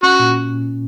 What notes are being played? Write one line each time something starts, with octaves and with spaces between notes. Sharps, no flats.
C#4 F#4
A#2